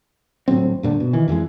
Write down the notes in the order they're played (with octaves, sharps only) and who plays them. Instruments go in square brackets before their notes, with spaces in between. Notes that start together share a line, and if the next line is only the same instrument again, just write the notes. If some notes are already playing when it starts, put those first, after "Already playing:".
[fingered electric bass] G1 A2 F#3 C4
G2 A#2 D3 A3
B2
D#3 E3
F2 E3 F#3 G#3